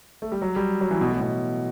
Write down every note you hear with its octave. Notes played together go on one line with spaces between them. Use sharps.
A3
G3
F#3
G3
F#3
E3
B2
A2
B2